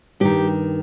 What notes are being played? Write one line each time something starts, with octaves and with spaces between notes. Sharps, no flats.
G2 D#3 G4